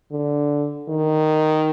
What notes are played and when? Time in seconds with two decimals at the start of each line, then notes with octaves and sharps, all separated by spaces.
0.12 D3
0.89 D#3